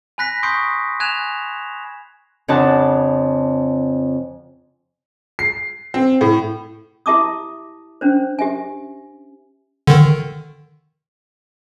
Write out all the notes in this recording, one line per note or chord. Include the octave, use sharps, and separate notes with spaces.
G#5 B5 F#6 A#6 B6
C6 C#6 D#6 G6 C7 D7
G#5 F#6 G#6 E7 F7
F2 C#3 C4 D4 F#5 A5
C7
C4
A2
E4 G4 E5 A5 D6 D#6
C#4 D4 C5
G4 E5 G#5
D3 D#3